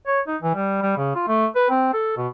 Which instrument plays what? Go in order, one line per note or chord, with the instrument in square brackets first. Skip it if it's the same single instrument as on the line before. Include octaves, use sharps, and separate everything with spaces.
[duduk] C#5
D#4
E3
G3
G3
C#3
F4
A3
B4
C4
A4
B2